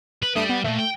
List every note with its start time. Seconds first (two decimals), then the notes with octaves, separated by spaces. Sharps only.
0.23 B4
0.35 G2 G3 A3 D#6
0.49 B3
0.64 D#2 A#2 A3
0.78 G5